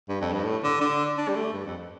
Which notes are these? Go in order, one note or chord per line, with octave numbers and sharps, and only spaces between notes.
G2
F2
G2
A2
D3
D3
D4
G3
A3
G2
F2